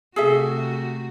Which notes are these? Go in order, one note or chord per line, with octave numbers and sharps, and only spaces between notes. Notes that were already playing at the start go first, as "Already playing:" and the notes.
C3 A3 F#4 G#4 A4 E5